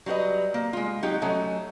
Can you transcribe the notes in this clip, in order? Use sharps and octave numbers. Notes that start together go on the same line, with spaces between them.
F#3 G3 F4 B4 D#5
A#3
G#3 F4
F#3 D#4 G4
F#3 A3 C#4 D#5